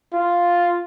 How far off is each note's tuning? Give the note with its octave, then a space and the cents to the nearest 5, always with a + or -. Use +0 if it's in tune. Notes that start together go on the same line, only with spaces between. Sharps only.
F4 +0